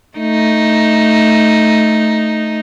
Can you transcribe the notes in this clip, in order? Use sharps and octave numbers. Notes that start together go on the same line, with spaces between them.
A3 D#4